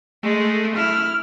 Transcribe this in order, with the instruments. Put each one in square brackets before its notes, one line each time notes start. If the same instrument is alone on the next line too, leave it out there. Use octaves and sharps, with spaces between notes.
[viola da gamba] G#3 [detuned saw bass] A3
[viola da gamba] E4 [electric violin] F6